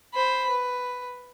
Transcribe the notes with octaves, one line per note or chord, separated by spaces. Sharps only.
C5 B5
B4